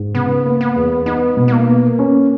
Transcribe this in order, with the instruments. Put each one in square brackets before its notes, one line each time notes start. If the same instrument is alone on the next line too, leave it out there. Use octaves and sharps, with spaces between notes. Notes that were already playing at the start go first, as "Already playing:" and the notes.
Already playing: [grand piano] G#2
[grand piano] C#3 [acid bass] B3
[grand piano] A#3
[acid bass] B3
[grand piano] E2
[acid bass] B3 [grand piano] D#4
[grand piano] B2
[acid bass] B3
A#3
[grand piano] B3
C#4